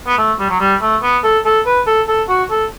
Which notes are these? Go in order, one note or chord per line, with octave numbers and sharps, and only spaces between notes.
B3
A3
G3
F#3
G3
A3
B3
A4
A4
B4
A4
A4
F#4
A4